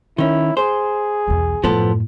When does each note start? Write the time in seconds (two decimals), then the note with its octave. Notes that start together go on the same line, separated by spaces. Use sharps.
0.18 D#3 C#4 E4
0.57 G#4 C5
1.28 B1 E2
1.64 F#2 A2 F3 B3 A4